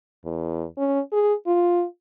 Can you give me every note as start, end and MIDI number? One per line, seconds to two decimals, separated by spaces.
0.24 0.66 40
0.78 1.00 61
1.12 1.33 68
1.46 1.84 65